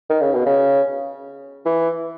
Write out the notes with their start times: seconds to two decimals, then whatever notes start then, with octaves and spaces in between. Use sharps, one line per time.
0.10 D#3
0.21 C#3
0.34 B2
0.46 C#3
1.66 E3